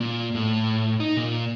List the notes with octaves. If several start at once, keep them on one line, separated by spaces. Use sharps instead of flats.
A#2
A2
D#4
A#2